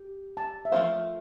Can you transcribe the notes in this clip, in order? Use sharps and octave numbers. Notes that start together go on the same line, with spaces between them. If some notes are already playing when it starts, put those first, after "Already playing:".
Already playing: G4
A5
E5
F3 A3 C4 F4 C5 F5